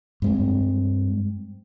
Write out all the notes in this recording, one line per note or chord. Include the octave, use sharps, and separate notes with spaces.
G2 G#3 C4